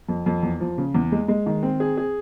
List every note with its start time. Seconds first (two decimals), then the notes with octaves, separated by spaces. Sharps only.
0.09 F2
0.26 F2
0.43 E2
0.60 F3
0.78 C#3
0.95 E2
1.12 G#3
1.28 G#3
1.46 D#3
1.63 C4
1.80 G#4
1.97 G#4